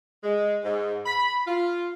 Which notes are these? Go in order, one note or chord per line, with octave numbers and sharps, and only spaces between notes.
G#3
G#2
B5
F4